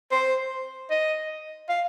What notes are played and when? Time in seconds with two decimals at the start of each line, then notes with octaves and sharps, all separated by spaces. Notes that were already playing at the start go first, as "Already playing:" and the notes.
0.11 C5
0.90 D#5
1.69 F5